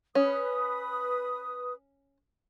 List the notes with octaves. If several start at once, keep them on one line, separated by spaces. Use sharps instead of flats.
C#4 B4 D#6